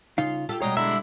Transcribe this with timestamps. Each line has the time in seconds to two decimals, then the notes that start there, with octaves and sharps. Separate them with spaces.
0.18 C#3 D#4 F4 F5
0.49 F4 G4 A4
0.62 B2 G3 G#3 C#5 G5 A#5 D#6
0.77 D3 D4 E4 E5 A#5